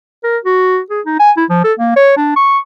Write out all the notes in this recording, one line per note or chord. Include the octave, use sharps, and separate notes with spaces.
A#4
F#4
G#4
D#4
G#5
E4
F3
A4
A#3
C#5
D4
C#6